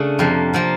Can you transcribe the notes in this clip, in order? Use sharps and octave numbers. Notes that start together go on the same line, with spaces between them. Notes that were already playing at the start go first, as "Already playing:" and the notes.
Already playing: C#3 A3 D4
F2 C3 F3 A#3
C3 F3 A#3